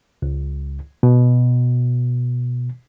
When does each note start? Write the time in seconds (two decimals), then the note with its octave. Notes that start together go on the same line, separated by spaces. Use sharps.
0.22 C#2
1.03 B2